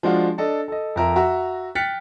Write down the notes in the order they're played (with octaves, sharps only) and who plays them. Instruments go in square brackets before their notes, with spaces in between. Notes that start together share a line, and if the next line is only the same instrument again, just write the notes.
[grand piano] F3 G#3 D4 F4 F#4
D4 A4 D#5
A4 D#5
F2 A#4 E5
F#4 E5 A#5
G5 F6 F#6 A6 B6 C#7